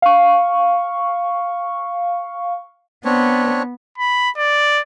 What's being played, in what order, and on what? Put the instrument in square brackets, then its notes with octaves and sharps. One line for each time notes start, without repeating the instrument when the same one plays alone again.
[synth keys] F5 C#6
[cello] B3 [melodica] C4 D4 C#5
[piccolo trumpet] B5
D5